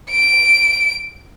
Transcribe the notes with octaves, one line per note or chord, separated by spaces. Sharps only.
D7